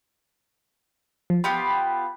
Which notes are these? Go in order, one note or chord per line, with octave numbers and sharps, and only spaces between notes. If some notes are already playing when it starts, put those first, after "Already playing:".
F3
B3 F4 G4 B5